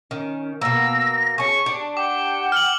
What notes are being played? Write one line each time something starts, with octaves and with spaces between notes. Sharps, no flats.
D#3 C#4
B2 A#3 E6 A#6
C#4 G#4 A5 C#6
D4 G4
F#5 G5 D6
F6 F#7